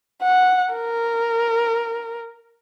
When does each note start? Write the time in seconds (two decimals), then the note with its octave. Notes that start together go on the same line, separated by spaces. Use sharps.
0.22 F#5
0.74 A#4